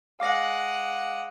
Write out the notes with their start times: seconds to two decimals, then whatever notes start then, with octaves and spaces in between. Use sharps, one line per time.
0.20 G#3 F5 F#5 D6 A#6